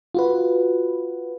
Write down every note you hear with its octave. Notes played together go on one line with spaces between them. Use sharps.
F4 F#4 B4